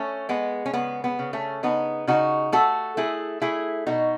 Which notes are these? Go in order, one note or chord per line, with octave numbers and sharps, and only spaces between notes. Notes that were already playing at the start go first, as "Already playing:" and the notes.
Already playing: A3 C#4
G#3 B3
C#4
C#3 B3
B3
C#3
A3 C#4
C#3 B3 D#4
C#3 D#4 F#4
A3 F#4 A4
A3 E4 G#4
A3 E4 G#4
B2 D#4 F#4